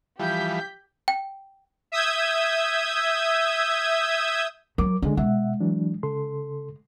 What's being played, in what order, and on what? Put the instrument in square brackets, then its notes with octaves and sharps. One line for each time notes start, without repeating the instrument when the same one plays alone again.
[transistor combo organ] E3 F3 G3 [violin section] G4 G6 B6
[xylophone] G5
[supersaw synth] E5 D#6 E6 G6 G#6
[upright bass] F#3 [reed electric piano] A#4 D6
[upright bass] D3 [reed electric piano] G#3 D4
[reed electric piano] B2 E5 F#5 [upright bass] G#3
[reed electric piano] E3 F#3 D4
C#3 A4 C6